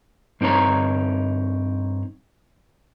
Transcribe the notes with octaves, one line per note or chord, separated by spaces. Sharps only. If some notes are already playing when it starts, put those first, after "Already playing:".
G2 C4 D#4 C#5 A#5